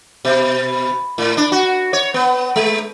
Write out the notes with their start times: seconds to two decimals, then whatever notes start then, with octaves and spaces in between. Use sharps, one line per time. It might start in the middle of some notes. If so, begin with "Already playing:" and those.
0.25 B2
1.18 A2
1.37 D4
1.52 F#4
1.93 C#5
2.14 B3
2.56 G#3